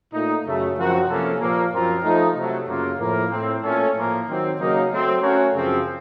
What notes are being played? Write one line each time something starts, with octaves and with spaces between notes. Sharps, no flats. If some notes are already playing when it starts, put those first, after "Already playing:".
A#2 A3 D#4
F#2 C#3 A3
F#2 F3 C4 F#4 A#4
C3 F3 A#3 C#4 A4
A#2 F3 A#3
F#2 F3 C4 F4 A#4
F3 A3 D#4
C3 F#3 A3
F#2 C#3 F#3 A#3 F4
A2 F3 A#3
A2 A3 C4
A#2 A3 C#4 A4 C#5
A2 F3 A#3
D#3 F#3 C4
C#3 F#3 A#3 D#4 A#4
F#3 A3 C4
A3 C#4 F#4 A#4 C#5
F#2 C#3 F3 C4